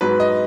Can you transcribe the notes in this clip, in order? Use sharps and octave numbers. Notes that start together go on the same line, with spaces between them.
G#2 F#3 B4
D#5